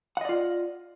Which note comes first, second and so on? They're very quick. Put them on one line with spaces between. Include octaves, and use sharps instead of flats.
F#5 D#5 D5 F4